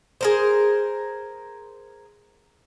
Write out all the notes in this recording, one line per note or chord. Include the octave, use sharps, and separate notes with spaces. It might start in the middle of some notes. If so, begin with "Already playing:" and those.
G#4 A#4 C5